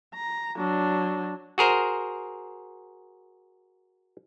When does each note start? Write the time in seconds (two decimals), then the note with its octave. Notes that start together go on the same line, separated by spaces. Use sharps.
0.14 A#5
0.57 F#3 D4
1.58 F#4 G#4 A#4 C5